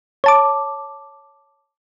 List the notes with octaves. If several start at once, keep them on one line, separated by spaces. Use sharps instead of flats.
C#5 A5 D6